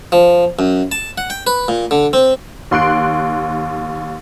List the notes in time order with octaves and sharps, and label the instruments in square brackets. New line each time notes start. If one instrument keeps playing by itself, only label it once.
[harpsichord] F3
F#2
A5
F#5
G5
B4
A#2
D3
C4
[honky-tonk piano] D#2 C6 F#6 D7